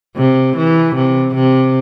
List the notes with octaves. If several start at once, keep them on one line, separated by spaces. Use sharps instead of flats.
C3
E3
C3
C3